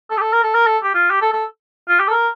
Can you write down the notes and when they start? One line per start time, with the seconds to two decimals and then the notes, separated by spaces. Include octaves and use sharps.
0.10 A4
0.17 G4
0.21 A4
0.33 A#4
0.43 A4
0.55 A#4
0.66 A4
0.83 G4
0.94 F4
1.11 G4
1.22 A4
1.33 A4
1.89 F4
2.00 G4
2.08 A4
2.11 A#4